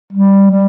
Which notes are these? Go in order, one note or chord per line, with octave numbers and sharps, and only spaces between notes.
G3
G3